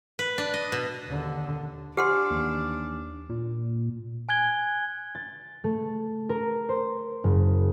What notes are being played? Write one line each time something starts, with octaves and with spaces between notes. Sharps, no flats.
B4
D4
D#5
B2
D#2 D3
D4 G4 F#5 G#5 C6 D6 F6
D#2 E3
A#2
G#5 F#6 G#6 G7
A6
A3
A#4
C5
F#1